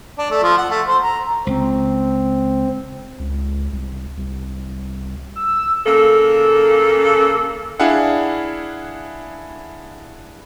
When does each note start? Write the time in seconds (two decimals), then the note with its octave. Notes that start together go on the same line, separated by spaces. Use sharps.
0.19 D4
0.31 A3
0.43 F3
0.58 F#5
0.70 A3
0.87 C5
1.03 A#5
1.47 C#2 C4
3.19 C#2
3.73 C2
4.17 C2
5.36 E6
5.86 C#3 A#3 A4
7.80 D4 E4 G#4 F5 F#5